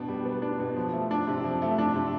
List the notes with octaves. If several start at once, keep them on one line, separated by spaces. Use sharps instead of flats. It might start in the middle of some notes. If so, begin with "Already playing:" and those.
Already playing: B2 B3 D4
G3
B3
D4
B2
F3
A3
D4
C3
F3
A3
D4
C3